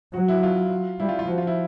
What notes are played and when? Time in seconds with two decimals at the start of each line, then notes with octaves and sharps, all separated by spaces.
0.14 F#3 F#4
0.28 E4
0.43 F4
1.00 G3 E4
1.09 F4
1.19 F4
1.27 F3 F#4
1.38 F4
1.47 E4